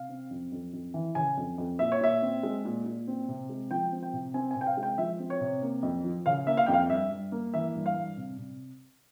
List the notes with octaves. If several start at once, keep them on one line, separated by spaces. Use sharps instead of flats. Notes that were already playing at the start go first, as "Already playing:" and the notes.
Already playing: C3 F5
C4
F2
F2
F2
E3
C#3 G#5
F2
F2
A#2 E5
C#5
A#2 E5
C4
G#3
A#2
A#2
C4
C3
G#3
F3 G5
C4
G5
C3
C4 G#5
G#5
C3
G5
F5
G#3
G5
F3 E5
C4
C#5
C3
A#3
F2
F3
C#3 F5
A#3 E5
F5
F2 G5
F5
G2 E5
G2
A#3
E3 E5
G2
F5
G2
C3
C3